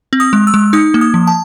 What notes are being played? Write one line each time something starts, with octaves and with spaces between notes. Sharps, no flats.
C4
D#6
G#3
E6
G#3
D#4 D#6
A#3
D#6
F3
A5